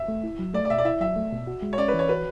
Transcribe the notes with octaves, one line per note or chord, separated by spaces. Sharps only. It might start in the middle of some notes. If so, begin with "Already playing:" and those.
Already playing: E5
A3
E4
F#3
A3 D5
D5
B2 E5
D5
E4 E5
F#3 E5
A3
B2
F#4
G#3
C#5
C#4 D5
B4
E3
C#5
F#4 B4